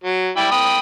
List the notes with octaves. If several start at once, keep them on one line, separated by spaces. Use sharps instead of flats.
F#3
G3 E4 G5
G5 B5 D#6